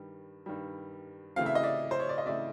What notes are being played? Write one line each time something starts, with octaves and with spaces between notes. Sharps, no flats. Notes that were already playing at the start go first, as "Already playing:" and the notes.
Already playing: G2 D#3 G3
G2 D#3 G3
C#3 E3 A3 C4 F5
E5
D#5
D5 E5
C5
C#5
D5
D#5
C#3 E3 A3 C4 D5 E5